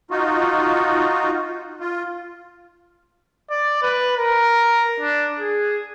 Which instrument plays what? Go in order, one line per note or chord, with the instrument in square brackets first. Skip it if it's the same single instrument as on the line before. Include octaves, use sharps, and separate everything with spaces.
[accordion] D#4 F4 F#4
F4
[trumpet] D5
B4
A#4
D4
G#4